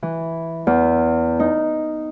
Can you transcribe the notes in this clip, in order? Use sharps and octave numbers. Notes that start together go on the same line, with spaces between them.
E3
E2
D#4